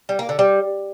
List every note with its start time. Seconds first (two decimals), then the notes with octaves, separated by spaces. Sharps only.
0.09 G3
0.19 A#3
0.29 D3
0.39 G3